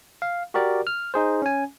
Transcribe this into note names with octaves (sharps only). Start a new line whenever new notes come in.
F5
F#4 G4 A#4 D5
F6
D#4 G#4 C5
C#4 G#5